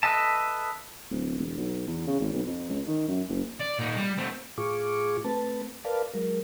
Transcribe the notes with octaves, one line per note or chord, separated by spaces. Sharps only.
A4 B4 D#5 E5 A5
D1
E1
B1
E2
C#3
G#1
B1
F2
C#2
D#3
F#2
F#1
D5
A#2 D#4
G3
A3 C4
A2 F4 G#4 C#6 D6
A3 C4 B4 A5
A#4 B4 D5 F5 A5
F#3 G#3 A#4